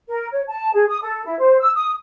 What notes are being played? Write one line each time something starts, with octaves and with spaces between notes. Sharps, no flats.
A#4
C#5
A5
G#4
D#6
A4
E4
C5
E6
D#6